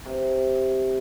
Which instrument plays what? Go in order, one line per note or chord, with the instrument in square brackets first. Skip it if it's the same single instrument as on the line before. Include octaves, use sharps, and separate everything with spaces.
[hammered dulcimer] C3